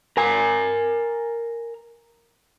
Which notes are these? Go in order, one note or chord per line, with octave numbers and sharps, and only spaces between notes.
A#4 G#5